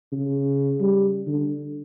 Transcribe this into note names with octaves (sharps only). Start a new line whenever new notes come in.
C#3
G3
D3